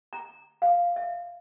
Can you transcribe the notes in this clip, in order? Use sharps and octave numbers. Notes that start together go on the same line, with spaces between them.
A#5
F5
E5